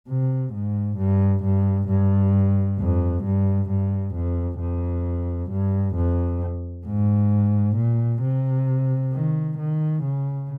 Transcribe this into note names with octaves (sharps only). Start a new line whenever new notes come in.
C3
G#2
G2
G2
G2
F2
G2
G2
F2
F2
G2
F2
G#2
A#2
C3
D#3
D#3
C#3